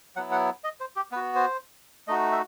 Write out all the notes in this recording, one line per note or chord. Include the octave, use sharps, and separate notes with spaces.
F#3 B3 E4 F#5
F#5
D#5
C5
G4
B3 F#4 B4
C5
A3 D#4 F#4 D#5
E5